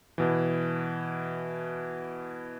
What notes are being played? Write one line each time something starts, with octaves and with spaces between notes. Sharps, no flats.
B2 E3